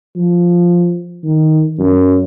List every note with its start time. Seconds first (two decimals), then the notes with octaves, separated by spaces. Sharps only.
0.16 F3
1.24 D#3
1.79 F#2